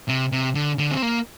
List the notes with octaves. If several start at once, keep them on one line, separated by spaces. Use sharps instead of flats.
C3
C3
D3
D3
C4
A#3